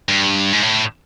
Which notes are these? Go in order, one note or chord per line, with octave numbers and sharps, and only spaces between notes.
G2
G#2
A2